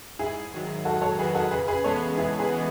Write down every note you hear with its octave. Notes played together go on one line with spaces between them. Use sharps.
G#2 E4 G#4
D#3 F#3
G#2 F#4 A4
A4 C#5
D#3 F#3 G#4 B4
F#4 A4
C#3 G#4 B4
G#4 B4
E3 G#3 B3 A4 C#5
C#3 E4 G#4
G#4 B4
E3 G#3 B3